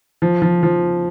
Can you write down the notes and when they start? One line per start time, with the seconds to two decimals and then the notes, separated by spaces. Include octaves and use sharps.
0.22 F3
0.42 F3
0.63 F3